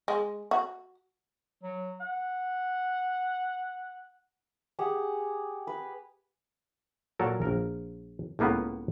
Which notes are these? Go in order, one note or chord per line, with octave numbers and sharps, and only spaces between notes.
G#3
F#4
F#3
F#5
G4 G#4 F#5
B4
A#2 F#3 A4 A#4
A#1 A#4
C#2 A2 A#3 B3 B4